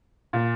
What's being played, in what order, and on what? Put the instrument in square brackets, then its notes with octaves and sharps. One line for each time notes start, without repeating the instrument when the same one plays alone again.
[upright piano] A#2